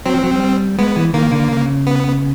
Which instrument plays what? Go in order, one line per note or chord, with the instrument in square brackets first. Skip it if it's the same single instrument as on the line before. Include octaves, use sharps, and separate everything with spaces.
[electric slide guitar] F#3 [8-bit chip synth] C4
[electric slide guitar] F3
F#3
G3
[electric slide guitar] G#3 [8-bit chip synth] B3
[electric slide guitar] E3
[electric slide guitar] D#3 [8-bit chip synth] A#3
[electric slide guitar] D3
C#3
[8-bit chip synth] B3